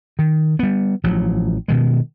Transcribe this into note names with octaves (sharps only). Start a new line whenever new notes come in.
D#3
G3 B3
A1 F3 F#3
B2 D#3 G#3